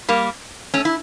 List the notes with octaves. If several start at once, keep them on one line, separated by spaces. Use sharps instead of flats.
G3 A#3
A3 C#4
E4